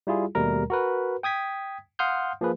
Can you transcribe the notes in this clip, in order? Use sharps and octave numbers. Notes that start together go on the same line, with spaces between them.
G3 E4 F4 G#4
D#2 B2 G3 A3 A#4 A#5
F#4 A#4 B4
G5 D#6 G#6 B6
F5 F#5 C6 D#6 F6 G6
F3 A#3 G#4 B4